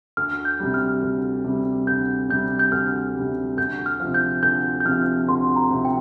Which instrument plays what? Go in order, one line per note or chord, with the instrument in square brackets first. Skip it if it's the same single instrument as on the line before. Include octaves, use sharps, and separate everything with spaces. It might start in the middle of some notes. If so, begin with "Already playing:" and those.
[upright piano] D2 [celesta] F6
[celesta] G6
[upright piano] C3 G3
[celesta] F6
[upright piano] D2
C3 G3
[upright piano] D2 [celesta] G6
[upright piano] C3 G3 [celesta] G6
[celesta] G6
[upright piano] D2 [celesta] F6
[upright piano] C3 G3
[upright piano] D2 [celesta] G6
[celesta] F6
[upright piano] F3
C3
[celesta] G6
[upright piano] D2 [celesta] G6
[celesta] G6
[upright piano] C3 F3 [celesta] F6
[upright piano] D2 [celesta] C6
[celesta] A#5
[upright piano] C3 F3
[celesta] G5